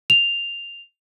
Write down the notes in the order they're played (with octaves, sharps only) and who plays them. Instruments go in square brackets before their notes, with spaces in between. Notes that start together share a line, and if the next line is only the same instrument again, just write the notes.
[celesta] F7